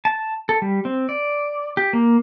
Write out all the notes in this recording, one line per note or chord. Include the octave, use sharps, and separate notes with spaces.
A5
A4
G3
C4
D5
G4
A#3